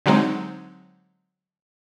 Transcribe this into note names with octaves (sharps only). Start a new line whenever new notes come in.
D3 F#3 G#3 C4 D#4